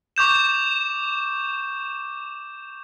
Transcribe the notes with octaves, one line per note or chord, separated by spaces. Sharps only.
C#6 D6 G6 E7